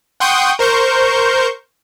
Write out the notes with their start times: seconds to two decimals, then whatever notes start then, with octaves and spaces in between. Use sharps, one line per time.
0.20 F#5 G5 C6 C#6 D#6 G6
0.59 A#4 C5 C#6 G6